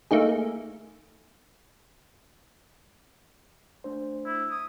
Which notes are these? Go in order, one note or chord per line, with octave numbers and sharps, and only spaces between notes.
A3 A#3 D#4 G#4
A3 D4 C5
E4
D#6